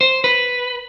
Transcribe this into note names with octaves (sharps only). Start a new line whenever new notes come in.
C5
B4